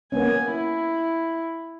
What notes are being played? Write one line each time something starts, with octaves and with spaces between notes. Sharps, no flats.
A#3 B3 C#4 G#5
E4